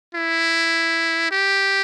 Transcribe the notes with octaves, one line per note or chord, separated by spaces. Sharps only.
E4
G4